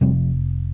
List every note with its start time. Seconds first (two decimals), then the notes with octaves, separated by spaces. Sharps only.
0.01 F1 F2 C3 G3 C4